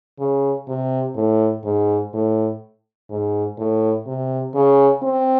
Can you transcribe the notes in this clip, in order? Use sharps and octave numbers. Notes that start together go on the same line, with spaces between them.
C#3
C3
A2
G#2
A2
G#2
A2
C3
C#3
C4